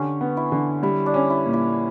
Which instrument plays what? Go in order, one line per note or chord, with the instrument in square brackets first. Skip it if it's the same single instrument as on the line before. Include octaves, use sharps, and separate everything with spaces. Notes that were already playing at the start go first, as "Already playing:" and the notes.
Already playing: [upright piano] D3 G4 [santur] C#4
[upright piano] B3
[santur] E4
[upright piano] D3
[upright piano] G3 [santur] E4
[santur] D4
[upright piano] C#4
[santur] E4
[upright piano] A#2
[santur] E4